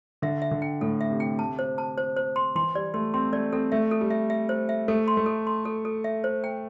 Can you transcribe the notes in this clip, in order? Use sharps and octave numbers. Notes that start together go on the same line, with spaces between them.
D3 E5
E5
D3
G5
A2 A4
E5
C3
G5
A5
C5
A5
C5
C5
C6
E3 C6
G3 D5
A3 C6
C4 C6
A3 D5
C4 A4
A3 E5
A4
G3
E5
E5
C5
E5
A3 A4
C6
A3
A4
C6
A4
A4
E5
C5
G5